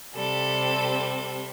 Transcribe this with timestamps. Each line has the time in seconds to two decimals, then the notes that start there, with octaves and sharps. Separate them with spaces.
0.15 C3 G3 A4